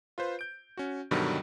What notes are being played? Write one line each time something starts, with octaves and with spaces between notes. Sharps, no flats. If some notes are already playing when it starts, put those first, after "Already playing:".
F4 B4 C5
G6 D7
C#4 F#4
G2 B2 D3 D#3 F#3 G3